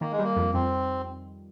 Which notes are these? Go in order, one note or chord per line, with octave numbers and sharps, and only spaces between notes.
D#3 A#3
G#3
G3 A#3
F2
F2 C4